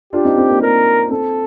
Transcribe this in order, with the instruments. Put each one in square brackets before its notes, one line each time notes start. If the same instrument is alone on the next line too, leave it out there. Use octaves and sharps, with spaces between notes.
[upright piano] D4 F4 [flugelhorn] G4
[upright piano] C4 D#4
C4
A#3 D4
[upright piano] A#3 D4 [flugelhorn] A#4
[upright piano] C4 [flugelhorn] A4